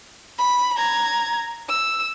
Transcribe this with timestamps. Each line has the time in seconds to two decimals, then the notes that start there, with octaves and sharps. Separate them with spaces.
0.39 B5
0.77 A#5 G#6
1.69 E6